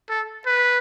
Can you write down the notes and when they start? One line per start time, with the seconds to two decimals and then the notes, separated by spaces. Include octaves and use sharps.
0.09 A4
0.46 B4